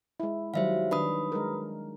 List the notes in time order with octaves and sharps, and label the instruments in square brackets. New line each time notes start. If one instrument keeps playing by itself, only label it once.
[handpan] G#3 E4
[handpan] D#3 F#3 G3 [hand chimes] C5 E5 F5
[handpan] D#3 D4 [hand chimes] B4 B5 D#6
[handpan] G#3 A#4